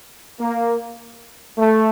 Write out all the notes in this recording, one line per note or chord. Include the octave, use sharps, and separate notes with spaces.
A#3
A3